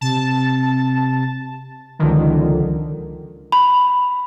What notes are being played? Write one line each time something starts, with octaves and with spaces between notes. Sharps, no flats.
C3 A5
C#2 D3 D#3 F3
B5